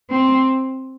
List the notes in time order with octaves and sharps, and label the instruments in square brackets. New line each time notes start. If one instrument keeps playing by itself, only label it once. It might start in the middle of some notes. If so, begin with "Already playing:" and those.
[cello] C4